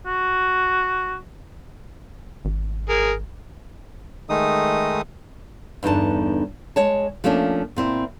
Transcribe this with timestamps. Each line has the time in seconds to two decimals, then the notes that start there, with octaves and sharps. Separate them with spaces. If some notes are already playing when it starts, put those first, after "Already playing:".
0.06 F#4
2.45 G#1
2.89 G#4 A#4
4.29 D#3 G#3 A3 D#4 D#6
5.83 E2 G2 D3 D#4 A5
6.76 G#3 C#5 A5
7.24 F3 A3 A#3 C#4 D4
7.76 A#2 C4 E4